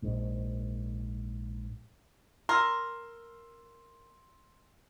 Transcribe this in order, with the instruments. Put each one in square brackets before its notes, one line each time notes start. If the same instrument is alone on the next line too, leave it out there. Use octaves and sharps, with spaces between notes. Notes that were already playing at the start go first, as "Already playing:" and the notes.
[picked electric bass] A#1 G#2
[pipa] A#4 [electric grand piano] C6 E6